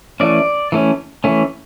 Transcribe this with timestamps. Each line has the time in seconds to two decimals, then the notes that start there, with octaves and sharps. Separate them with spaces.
0.20 E3 A3 C#4 D5
0.72 E3 A3 C#4
1.24 E3 A3 C#4